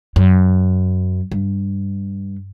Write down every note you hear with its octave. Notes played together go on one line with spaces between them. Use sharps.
F#2
G2